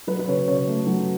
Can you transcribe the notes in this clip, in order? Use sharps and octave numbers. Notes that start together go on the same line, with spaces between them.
F#3 B4
B4
C#3 C#5
C#3 C#5
A3
F#3